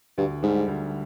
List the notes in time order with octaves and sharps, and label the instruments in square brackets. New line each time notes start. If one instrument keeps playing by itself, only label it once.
[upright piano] D2 [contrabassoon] G2
[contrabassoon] G#2 [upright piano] D3 G3
[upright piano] D2